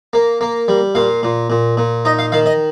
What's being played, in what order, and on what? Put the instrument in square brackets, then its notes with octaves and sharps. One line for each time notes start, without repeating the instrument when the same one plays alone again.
[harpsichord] A#3
A#3
G3
A#2 F5
A#2
A#2
A#2
D#4 D#5
F5
D#3 F5
D#5